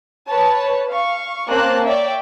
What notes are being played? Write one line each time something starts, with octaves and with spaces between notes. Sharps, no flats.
B4 C#5 A5
F5 C#6
A#3 C4 C#4 A5 F#6
C#5 D5 E5 G5